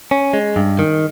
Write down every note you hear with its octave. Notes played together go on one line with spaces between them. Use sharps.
C#4
G#3
G2
D#3